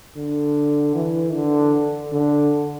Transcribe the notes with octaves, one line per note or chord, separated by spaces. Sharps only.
D3
E3
D3
D3